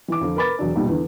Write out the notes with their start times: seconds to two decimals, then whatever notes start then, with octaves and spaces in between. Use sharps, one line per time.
0.08 E3 D6
0.21 F2 D3 F3
0.36 A#4 B4 B5 D6 A6
0.58 E1 F#3 D4
0.76 B1 A#2 G3 A#3 D#4
0.88 E2 D3